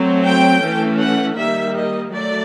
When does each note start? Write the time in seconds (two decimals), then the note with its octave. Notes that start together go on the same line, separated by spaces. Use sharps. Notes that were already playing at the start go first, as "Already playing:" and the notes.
Already playing: F#3 A3 C4
0.24 G5
0.61 E3 A3 C#4
0.99 F#5
1.36 D#3 G3 A#3 E5
1.74 D#5
2.12 F#3 A3 D5